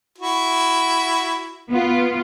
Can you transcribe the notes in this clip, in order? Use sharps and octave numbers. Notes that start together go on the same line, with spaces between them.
E4 F#4
B3 F4